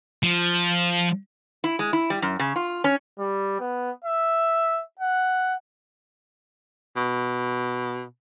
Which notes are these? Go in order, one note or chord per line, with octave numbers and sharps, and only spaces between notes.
F3
E4
G#3
E4
G3
F#2
C#3
F4
C#4
G3
B3
E5
F#5
B2